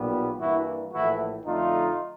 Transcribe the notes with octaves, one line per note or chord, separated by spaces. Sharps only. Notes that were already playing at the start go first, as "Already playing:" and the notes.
Already playing: B1 A#2 G3 B3
G2 E3 G3 A#3 E4 F#4
A#1 A2 E3 A3 E4 F#4
F2 D3 F3 A3 D#4 F4